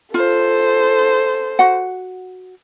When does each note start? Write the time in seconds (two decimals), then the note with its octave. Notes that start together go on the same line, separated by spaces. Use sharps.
0.14 F4 A4 C5
1.59 F#4 F#5